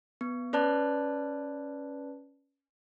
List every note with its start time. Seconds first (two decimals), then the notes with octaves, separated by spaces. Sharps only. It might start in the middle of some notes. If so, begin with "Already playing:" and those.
0.21 B3
0.53 C#4 B4 D5 A5 F#6